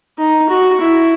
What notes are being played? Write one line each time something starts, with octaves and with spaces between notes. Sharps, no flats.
D#4
F#4
E4